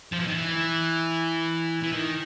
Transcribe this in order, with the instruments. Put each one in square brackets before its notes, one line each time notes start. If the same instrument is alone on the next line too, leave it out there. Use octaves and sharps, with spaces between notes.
[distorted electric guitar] F3
E3
D#3
E3
E3
D#3